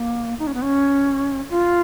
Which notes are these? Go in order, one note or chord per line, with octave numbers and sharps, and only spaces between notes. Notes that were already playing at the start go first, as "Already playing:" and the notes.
Already playing: A#3
D#4
C#4
B3
C#4
F4